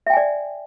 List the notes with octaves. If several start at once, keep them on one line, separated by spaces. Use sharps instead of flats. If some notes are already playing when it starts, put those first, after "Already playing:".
D5 E5 G5 G#5